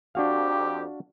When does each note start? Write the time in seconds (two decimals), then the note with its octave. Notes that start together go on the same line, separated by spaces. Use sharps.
0.15 F2 D4 F#4 G4 F5